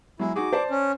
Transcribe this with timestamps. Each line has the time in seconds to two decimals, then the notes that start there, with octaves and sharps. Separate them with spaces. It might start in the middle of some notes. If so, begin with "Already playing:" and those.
0.19 F#3 G#3 E4
0.36 D#4 F#4 G#4 D6
0.53 C5 D5 A5
0.70 C#4